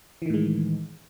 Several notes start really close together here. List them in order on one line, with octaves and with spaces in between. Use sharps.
E3 D#3 A2 G#3